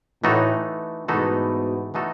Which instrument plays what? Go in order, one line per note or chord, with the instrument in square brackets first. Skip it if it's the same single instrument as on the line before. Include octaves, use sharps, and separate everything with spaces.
[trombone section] A2 [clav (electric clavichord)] E3 A3 D#4 F#4 A4
[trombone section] G#2 B2 [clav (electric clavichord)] E3 A3 D#4 F#4 A4
[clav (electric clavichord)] E3 A3 D#4 F#4 A4